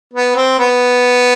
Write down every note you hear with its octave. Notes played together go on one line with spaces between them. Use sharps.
B3
C4
B3